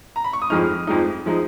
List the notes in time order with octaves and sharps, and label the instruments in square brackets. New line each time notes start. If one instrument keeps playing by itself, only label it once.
[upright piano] A#5
B5
C#6
D#6
F2 F3 G#3 D#4 F6
F2 F3 G#3 D#4
F3 G#3 D#4